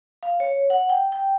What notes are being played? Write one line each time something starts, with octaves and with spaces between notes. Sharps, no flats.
F5
C#5
F#5
G5
G5